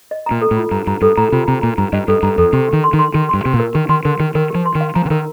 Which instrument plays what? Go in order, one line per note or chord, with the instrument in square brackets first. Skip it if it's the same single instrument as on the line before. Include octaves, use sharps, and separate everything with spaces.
[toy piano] D#5
[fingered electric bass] A#2 [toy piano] A#5
[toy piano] A4
[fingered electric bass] A2
[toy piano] F4
[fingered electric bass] G2 [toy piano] A#5
[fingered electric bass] G2 [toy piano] A#5
[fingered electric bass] G2 [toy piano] A4
[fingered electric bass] A2 [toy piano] A#5
[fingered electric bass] C3 [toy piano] F4
[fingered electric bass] C3 [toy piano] A#5
[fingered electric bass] A#2 [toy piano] A#5
[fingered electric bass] G2 [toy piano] A#5
[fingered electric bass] G2 [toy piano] D#5
[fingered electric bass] G2 [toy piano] A4
[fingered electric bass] G2 [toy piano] A#5
[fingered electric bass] F2 [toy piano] A4
[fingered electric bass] C3 [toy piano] G4
[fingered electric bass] D#3 [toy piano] G4
[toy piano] C6
[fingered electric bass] D#3
[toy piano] C6
[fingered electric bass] D#3 [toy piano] G4
[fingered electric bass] G2 [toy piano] C6
[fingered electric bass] C3 [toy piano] G4
[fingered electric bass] A#2
[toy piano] A#4
[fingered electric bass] D#3 [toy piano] G4
[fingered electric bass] D#3 [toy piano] C6
[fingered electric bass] D3 [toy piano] A#4
[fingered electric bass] D#3 [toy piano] G4
[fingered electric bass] D#3 [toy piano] A#4
[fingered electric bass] F3 [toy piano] G4
[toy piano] C6
[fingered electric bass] D#3
[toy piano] F5
[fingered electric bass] F3 [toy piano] A#5
[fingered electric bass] D3
[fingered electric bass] D#3 [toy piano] A#4